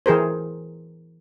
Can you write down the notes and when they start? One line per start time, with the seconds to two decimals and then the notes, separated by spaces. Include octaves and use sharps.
0.06 E3 G#4 A#4 C5